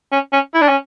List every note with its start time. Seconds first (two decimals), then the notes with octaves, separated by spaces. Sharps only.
0.12 C#4
0.33 C#4
0.54 E4
0.61 D4
0.68 C#4